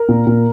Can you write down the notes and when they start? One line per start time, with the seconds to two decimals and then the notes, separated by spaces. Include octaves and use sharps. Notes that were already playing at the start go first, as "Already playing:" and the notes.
Already playing: A#4
0.09 A#2
0.27 A#2